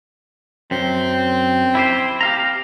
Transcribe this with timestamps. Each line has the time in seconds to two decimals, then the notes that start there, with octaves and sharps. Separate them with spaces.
0.71 F#2 C4
1.75 E4 G4 C5
2.21 G4 F5 A#5